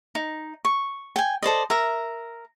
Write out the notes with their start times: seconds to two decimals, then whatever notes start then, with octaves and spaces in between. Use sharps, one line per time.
0.15 D#4
0.65 C#6
1.16 G5 G#5
1.43 A4 C5 D5 D#5
1.70 A#4 E5 A#5